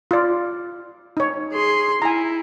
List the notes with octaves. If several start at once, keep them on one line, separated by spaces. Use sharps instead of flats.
F4 D5
D#4 C#5
G#4 C6
E4 G#5 A#5